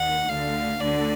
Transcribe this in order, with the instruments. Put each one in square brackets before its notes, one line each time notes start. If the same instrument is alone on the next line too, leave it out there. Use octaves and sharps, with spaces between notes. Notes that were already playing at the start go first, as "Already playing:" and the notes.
Already playing: [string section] D#2 D#3 [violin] F#5
[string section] D2 D3 [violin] F5
[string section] D2 D3 [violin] D5